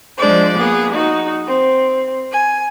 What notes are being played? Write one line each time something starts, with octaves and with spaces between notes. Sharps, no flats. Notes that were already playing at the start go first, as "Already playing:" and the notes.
F3 G#3 D4 C5 D5
A#3 B3 G#4
D#4 F#4
C4
G#5